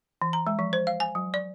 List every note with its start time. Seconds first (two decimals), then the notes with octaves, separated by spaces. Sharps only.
0.22 E3
0.33 A#5
0.47 G#3
0.59 F3
0.73 C5
0.87 F5
1.00 G#5
1.15 F#3
1.34 D5